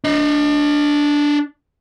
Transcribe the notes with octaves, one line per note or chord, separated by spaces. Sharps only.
D4 D#5